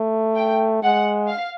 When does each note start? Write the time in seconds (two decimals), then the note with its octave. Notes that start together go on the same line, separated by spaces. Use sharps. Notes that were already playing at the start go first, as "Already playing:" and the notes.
Already playing: A3
0.36 G5
0.83 G#3 F#5
1.28 F5